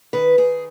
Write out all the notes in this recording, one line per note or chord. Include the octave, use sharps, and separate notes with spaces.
D#3 B4
D#3 G#4